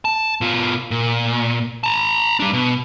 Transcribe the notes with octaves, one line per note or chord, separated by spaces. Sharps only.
A5
B2 F4
A#2
A5 A#5
G3 D4
B2